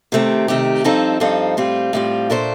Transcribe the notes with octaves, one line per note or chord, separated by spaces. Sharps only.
C3 D#3 A3 C4 G4
C3 D#3 A3 C4 G4
G2 F3 C4 D#4 A4
G2 F3 C4 D#4 A4
A2 G3 C4 F4
A2 G3 C4 F4
A#2 A3 D4 A4 C5